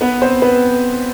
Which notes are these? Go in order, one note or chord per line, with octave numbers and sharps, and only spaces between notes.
B3 B4
C4 C5
B3 B4